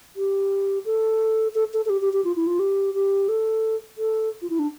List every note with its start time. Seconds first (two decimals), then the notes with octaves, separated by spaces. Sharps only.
0.16 G4
0.85 A4
1.55 A4
1.74 A4
1.85 A4
1.90 G4
2.01 G4
2.13 G4
2.24 F4
2.36 E4
2.47 F4
2.59 G4
2.94 G4
3.29 A4
3.98 A4
4.42 F4
4.50 E4
4.59 D4